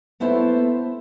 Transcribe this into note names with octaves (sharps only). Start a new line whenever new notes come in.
A3 B3 E4 A4 C5 E5